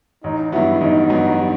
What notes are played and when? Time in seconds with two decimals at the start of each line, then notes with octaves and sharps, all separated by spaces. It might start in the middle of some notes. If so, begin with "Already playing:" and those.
0.24 A1 D#4
0.52 G2 F#3 B3 E4
0.81 A1 D#4
1.10 G2 F#3 B3